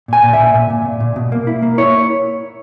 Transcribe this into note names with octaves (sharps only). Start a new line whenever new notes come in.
A#2 G#5
A#2
E5
A#2
A#2
A#2
A#2
A#2
B2
A#3
E4
A#3
E4 C#5